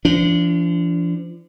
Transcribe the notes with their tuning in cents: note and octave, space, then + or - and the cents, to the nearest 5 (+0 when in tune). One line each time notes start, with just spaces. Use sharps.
F3 -40 D4 -25